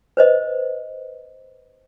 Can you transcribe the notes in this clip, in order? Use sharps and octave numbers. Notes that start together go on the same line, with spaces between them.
B4 C5 D#5